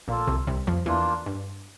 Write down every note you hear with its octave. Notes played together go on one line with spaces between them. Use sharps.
A#1 A#2 A#3 F4 A4
C2 C3
C2 C3
F2 F3
E2 E3 A#3 D4 F4
G2